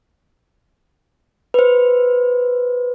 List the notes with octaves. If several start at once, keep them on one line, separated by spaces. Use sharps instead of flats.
B4 C5